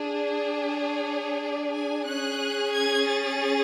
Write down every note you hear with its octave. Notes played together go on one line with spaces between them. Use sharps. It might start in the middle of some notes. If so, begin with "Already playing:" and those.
Already playing: D4 G#4
C#5
D5
G#5
C#4 G#4 F#6
G#6
A6